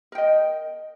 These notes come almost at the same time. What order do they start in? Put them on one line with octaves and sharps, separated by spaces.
A#4 G5 D#5